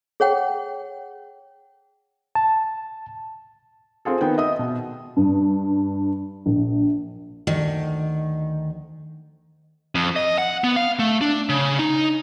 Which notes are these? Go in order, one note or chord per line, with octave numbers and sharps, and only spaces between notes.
G#4 C#5 F#5 G5
A5
C4 F4 G#4 A4
D#3 B3 G5
D#5 E5 D#6
B2
G2
A#1
D2 D#3
F2
D#5
F#5
B3
F5
A3
D4
C#3
D#4